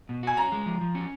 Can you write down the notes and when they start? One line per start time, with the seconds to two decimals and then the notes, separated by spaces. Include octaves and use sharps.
0.09 B2
0.23 F#4 G#5
0.37 C#4 A#5
0.52 G#3
0.66 F3
0.81 F3
0.95 C#4